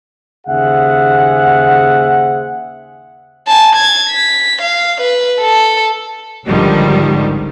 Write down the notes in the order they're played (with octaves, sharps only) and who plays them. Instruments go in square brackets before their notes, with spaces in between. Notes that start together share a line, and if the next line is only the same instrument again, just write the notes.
[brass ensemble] D#2 C#3 G#4 C5 E5 F#5
[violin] G#5 A5
G#6 A6
B6
F5
B4
A4
[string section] G#1 C#2 D3 D#3 F3 G3